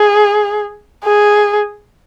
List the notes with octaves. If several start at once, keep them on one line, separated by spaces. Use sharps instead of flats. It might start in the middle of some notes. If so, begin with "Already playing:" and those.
Already playing: G#4
G#4